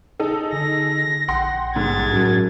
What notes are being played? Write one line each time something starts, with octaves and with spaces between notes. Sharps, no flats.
D#4 G#4 A4
D3 A#6
A#1 F#5 G5 C6
G1 G#2 F#5 G#6 A6
F#2 A2